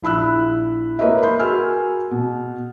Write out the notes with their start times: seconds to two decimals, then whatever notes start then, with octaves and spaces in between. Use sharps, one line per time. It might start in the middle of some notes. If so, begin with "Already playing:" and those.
0.02 A#1 E4 B5 E6 F#6
0.99 A#3 A#4 B4 C#5 D#5 E5
1.23 B5 C6 G6
1.39 F#4 G#4 A#4 G#5 E6 F6
2.11 B2